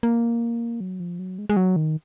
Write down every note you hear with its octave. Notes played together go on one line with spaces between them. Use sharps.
A#3
F#3
F3
F#3
G#3
G#3
F#3
D#3